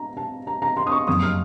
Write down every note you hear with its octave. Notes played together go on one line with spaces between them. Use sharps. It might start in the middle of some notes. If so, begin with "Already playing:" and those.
Already playing: A#5
A5
A#5
A#5
C6
D#6
C#6
F#1 F2 C#3 D#6
F6